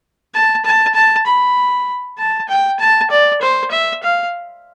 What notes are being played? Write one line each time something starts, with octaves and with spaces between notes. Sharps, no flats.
A5
A5
A5
B5
A5
G5
A5
D5
C5
E5
F5